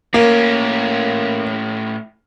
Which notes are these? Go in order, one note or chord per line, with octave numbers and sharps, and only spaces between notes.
A2 A#3 C#4